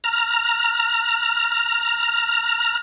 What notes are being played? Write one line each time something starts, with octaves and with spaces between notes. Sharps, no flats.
A#5 F6